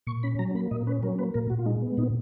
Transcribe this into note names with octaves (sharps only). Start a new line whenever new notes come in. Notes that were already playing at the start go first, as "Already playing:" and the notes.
A#2 C#6
C#4 B5
F#3 A#5
A#3 B5
A#2 D#5
C#4 B4
F#3 A#4
A#3 B4
A#2 A#4
A#2 F#4
F4
G#3 D#4
B3
A#2 D#4